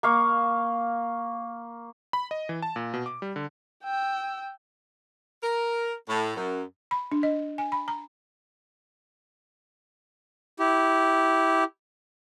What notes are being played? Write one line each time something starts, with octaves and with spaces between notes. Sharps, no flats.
A#3 F5 C#6
B5
D#5
E3
A5
A#2
B2
D6
G3
D3
G5 E6
A#4
A2
F#2
B5
D4
D#5
G#5
B5
A#5
E4 G4